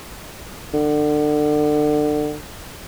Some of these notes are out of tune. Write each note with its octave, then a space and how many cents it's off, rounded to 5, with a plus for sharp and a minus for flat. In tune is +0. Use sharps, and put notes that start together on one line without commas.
D3 +30